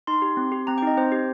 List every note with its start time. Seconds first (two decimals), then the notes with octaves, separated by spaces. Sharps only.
0.07 D#4 C6
0.22 G4
0.37 C4
0.52 G4
0.67 C4 A#5
0.78 G5
0.82 D#4 D#5
0.97 C4 C5
1.12 G4